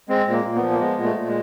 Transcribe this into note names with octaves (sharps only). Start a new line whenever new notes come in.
G#3 C4
A#2
A#3
A#2
B3
F3
A#3
G#3 B3
A#2
A3
A#2
G#3